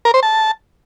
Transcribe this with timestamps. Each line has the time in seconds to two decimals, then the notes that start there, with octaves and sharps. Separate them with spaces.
0.05 A#4
0.14 C5
0.23 A5